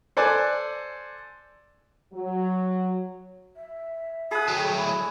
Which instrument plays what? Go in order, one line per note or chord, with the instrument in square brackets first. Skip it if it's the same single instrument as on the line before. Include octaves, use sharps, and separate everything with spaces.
[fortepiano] A4 C5 D5 G#5 D6 F#6
[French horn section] F#3
[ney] E5
[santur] G#4 F#5 [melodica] A5 B5 D#6
[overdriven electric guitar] F#3 A3 [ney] G5
[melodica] E4 [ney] G#5